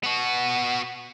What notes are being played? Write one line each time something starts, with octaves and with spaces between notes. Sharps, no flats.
B3 F#4